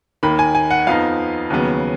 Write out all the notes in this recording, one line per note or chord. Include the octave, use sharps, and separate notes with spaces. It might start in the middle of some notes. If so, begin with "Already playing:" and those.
D#2 D#3 A#3 B5
G#5
G#5
F#5
F2 F3 B3 D#4 F5
D#2 C#3 F#3 B3